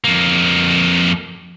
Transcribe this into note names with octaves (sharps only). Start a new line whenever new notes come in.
F2 A#3